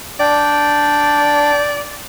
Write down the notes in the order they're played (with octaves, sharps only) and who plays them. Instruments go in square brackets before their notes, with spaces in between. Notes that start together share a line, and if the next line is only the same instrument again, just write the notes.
[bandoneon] D4 G5 [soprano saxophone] D5